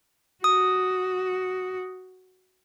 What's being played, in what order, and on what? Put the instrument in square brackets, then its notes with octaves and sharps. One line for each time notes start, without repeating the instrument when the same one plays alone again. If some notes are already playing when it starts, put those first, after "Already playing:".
[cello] F#4 [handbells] D#6